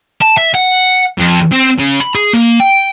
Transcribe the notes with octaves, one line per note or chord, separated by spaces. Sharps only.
A5
E5
F#5
F2
C4
C#3
B5
G#4
A#3
G5